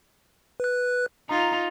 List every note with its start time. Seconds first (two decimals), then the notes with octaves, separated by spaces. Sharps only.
0.60 B4 F#6
1.29 D#4 F4 A#5